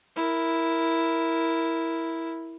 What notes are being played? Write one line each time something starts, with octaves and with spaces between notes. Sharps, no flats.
E4 A#4